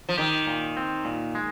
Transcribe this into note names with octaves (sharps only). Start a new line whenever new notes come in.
F3
D#3 G4
A#2
C4
A#2
G#3